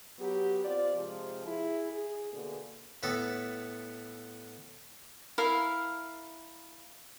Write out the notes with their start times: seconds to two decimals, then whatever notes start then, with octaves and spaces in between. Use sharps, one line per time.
0.19 F#3 B3 G4
0.65 C4 F4 C5 D5
0.95 C3 F3 G#3 F4 G4
1.47 E4 G#4
1.93 G#4
2.32 B2 D3 A3 A#3 G#4
3.03 A2 B3 A4
5.38 E4 A#4 F5